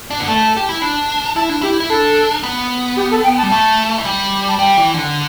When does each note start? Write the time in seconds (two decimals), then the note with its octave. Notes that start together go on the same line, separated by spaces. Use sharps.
0.10 D4
0.20 B3
0.28 A3 A5
0.57 G4
0.69 E4
0.82 D4
1.36 E4 A5
1.49 D4
1.61 E4 G4
1.80 E4
1.90 D4 A4
2.43 B3
2.97 G4
3.11 A4
3.24 G5
3.38 A5
3.43 G3
3.51 A3 A5
3.98 E3
4.05 G3
4.48 A5
4.58 G3 G5
4.77 E3
4.94 D3